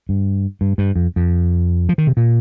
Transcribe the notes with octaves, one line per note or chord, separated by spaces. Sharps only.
G2
G2
G2
F2
F2
F3
D#3
C3
A#2